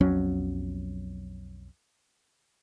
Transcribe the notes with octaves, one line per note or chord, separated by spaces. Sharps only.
B1 F2 F#3 C#4